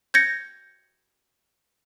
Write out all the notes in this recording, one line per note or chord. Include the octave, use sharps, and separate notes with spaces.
G6 G#6 A#6 C#7